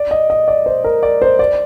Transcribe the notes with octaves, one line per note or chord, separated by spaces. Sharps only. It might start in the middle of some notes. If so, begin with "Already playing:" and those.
Already playing: D5
D#5
D#5
D5
C5
A#4
D5
C5
D5